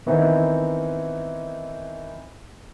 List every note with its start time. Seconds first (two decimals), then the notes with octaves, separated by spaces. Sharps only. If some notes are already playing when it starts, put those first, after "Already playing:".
0.06 D#3 E3 B3 C4 D#4 E4